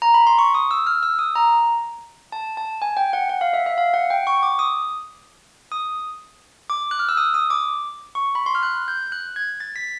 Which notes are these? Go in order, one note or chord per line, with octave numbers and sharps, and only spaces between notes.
A#5
B5
C6
C#6
D#6
E6
F6
E6
D#6
A#5
A5
A5
G#5
G5
F#5
F#5
F5
E5
E5
F5
F#5
G5
C#6
D6
D#6
D#6
D6
F#6
F6
E6
D#6
D#6
D6
C#6
B5
C6
F6
F#6
G6
F#6
G#6
A6
B6